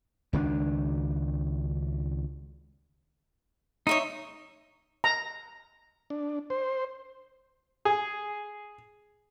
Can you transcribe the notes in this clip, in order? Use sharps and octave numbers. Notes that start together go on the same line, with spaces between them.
C#2 D#3 C4 D4
D#4 C#5 E5 C6
A#5
D4
C5
G#4